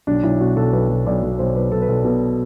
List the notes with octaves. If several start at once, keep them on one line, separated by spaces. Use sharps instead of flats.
B1 D4
B1 E4
B2 F#4
B1 A4
B1 B4
B1
B1 D5
B1
B1 C5
B1 B4
B1 A4
B4
B1 A4
B2 B4